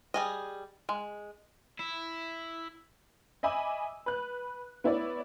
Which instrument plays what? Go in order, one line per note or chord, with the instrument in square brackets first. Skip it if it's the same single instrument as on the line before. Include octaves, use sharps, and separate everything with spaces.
[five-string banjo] G3 G#4 D#5
G#3
[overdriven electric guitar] E4
[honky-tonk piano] D#5 E5 G#5 B5 D6 E6
B4 F#6
B3 E4 C#5 D5